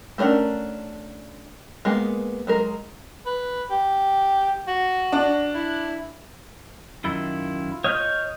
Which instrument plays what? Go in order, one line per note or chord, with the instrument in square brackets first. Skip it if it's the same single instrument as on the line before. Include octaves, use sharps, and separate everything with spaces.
[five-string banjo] A3 C#4 D4 A#4 F#5
G#3 A#3 B3
F#3 G#3 A#4
[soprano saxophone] B4
G4
F#4
[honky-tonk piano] D4
[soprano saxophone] E4
[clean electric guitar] F#2 D#3 E4 [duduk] F4
[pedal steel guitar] C#5 F6 G6 [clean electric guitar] D#5